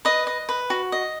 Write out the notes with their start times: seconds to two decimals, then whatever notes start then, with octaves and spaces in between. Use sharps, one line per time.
0.05 B4 D#5
0.27 D#5
0.49 B4
0.70 F#4
0.92 D#5